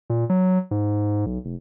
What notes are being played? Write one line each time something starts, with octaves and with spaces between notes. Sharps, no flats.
A#2
F#3
G#2
B1
F1